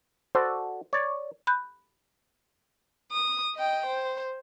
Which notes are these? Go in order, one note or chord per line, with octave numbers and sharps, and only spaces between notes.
F#4 A4 C5 D5
C#5 D5
B5 F#6 G6
D#6
D#5 G5
C5